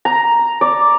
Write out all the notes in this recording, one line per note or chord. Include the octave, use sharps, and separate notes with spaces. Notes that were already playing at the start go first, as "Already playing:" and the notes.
A#5
D5